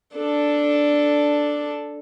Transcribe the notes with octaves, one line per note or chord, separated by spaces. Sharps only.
D4 A4